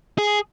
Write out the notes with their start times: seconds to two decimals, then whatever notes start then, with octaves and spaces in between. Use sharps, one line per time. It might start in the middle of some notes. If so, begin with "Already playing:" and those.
0.18 G#4